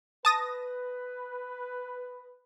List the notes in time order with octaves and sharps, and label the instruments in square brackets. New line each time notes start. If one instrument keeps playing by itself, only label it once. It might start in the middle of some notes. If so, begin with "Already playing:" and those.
[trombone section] B4 [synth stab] A5 D#6 A#6